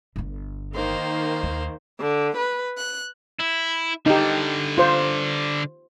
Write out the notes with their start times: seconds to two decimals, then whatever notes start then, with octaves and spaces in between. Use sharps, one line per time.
0.16 G1 D3
0.75 D#3 A#3 C5
1.43 D#2
2.00 D3
2.37 B4
2.77 F#6
3.39 E4
4.06 D3 G3 D#4 G4
4.78 F4 C5